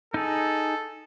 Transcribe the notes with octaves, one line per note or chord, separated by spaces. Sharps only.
D#4 G#4 A4